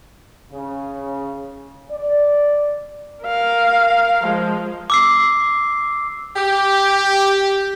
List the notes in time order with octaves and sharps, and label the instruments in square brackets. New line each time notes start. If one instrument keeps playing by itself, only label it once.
[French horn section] C#3
D5
[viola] A#4 F5
F3 G#3
[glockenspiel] D6 E6 C7
[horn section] G4